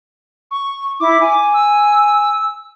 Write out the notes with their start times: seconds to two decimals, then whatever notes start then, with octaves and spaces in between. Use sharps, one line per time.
0.51 C#6
1.00 E4 D6
1.20 G#5
1.54 E6